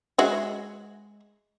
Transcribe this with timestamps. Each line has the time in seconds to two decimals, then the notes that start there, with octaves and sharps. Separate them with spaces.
0.18 G#3 F#4 E5